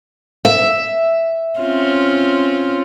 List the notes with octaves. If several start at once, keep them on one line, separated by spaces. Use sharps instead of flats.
E5
C4 C#4 F4